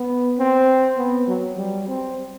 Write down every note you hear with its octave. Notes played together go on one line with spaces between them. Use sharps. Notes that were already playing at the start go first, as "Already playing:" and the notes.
Already playing: B3
C4
B3
F#3
G3
C4